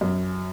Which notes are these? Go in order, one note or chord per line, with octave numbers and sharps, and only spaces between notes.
F#2